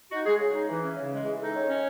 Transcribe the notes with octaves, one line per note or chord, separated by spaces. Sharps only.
D#4 F#4
G#3 G#4
C#3 G#4
D#4
E3
C#4
C#3
G#3
E3 G#4
D#4 A4
D#3 C#5
C#4